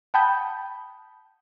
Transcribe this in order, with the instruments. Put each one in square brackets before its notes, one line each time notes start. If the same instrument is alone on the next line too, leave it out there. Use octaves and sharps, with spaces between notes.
[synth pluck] F#5 G5 A5 B5 D#6 G6